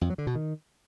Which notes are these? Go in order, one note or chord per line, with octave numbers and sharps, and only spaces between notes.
F2
F#3
D3
B2
D#3